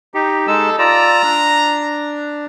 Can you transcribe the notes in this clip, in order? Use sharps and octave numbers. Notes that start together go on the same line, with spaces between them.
D#4 G4
G#3 D#4 A4 E6
F4 D5 A#5 E6
D4